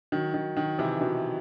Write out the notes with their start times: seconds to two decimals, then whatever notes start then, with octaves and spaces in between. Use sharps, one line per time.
0.12 D#3 F#3
0.34 D#3 F#3
0.57 D#3 F#3
0.79 C3 E3
1.01 B2 D#3